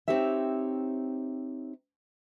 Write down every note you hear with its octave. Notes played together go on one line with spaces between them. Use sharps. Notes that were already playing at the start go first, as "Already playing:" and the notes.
C4 D#4 G4 C#5 E5